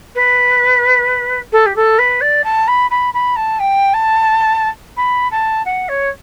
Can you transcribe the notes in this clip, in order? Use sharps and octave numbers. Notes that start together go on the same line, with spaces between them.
B4
A4
G4
A4
B4
D5
A5
B5
B5
B5
A5
G5
A5
B5
A5
F#5
C#5